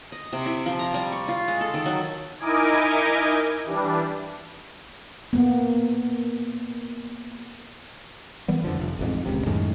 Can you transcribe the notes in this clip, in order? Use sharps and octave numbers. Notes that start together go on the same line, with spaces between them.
D#5
C3
E4
F3
A#5
G3
C#6
F4
G#3
A4
D#3
F#3
D#4 E4 A#4 D#5 G#5 D6
E3 G3 D4
A#3 B3
E3 G3 B3
F2 D3 F3
F1
A1 F2 G#2
D#1 C#2 C3
F#2 A2 D#3 G#3